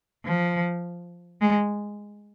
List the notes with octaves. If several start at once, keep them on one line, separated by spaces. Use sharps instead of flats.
F3
G#3